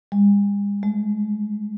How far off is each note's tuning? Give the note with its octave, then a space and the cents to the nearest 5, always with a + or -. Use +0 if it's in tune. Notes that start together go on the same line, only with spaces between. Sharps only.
G#3 -45
G#3 +30